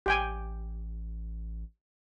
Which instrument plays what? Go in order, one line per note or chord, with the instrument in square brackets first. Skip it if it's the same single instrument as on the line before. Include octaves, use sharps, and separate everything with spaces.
[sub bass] A1 [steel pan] G4 G5 G#5